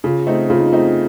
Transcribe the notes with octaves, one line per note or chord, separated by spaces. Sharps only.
C#3 F4
A3 C4 D#4
C#3 F4
D#4
F4
A3 C4 D#4